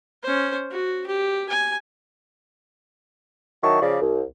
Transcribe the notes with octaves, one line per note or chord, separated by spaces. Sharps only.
C#4 C5
F#4
G4
G#5
D#3 F#3 E4 A5 C#6
C#3 F3 D5
C2